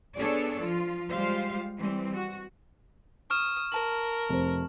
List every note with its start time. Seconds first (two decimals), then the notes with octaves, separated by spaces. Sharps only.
0.17 B3 D4 G#4 A4 C#5 D5
0.60 F3 F4
1.09 G3 G#3 F4 G4 C5 F5
1.77 E3 G3 C4
2.14 F#4
3.30 C#6 D#6 F6 E7
3.72 A#4 A5 F#7
4.29 F1 C5